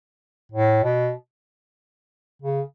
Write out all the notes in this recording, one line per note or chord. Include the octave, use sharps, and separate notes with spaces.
A2
B2
C#3